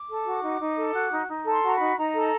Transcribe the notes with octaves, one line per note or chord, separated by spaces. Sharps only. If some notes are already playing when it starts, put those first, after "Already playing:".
Already playing: D6
A4
F#4
D#4
D#4
A4
F#4
D#4
D#4
A4
C6
F#4 A#5
B5
D#4
D#4 A#5
A4